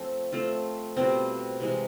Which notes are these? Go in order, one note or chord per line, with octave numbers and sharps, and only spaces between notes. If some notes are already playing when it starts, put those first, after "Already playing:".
Already playing: F3 A3 C4
A3 C4 F4
B2 G3 C4 F4
C3 E3 G#3